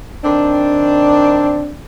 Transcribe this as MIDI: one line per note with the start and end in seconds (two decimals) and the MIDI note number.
0.24 1.74 51
0.24 1.74 60
0.24 1.74 62